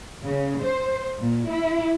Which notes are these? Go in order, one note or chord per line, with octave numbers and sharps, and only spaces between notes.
C#3
C5
A#2
E4